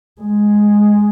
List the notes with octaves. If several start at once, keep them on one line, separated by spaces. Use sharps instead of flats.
G#3